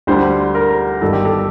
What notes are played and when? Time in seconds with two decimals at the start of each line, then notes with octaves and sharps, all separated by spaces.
0.07 D2 D3 G3 C5
0.55 A#4
1.02 G1 G2 D#3 A4
1.13 G4
1.25 A4